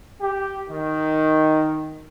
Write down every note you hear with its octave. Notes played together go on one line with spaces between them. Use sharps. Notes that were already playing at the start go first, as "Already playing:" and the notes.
G4
D#3